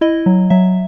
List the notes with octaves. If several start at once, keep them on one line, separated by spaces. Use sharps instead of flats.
E4 D#5
F#3
F#3 E5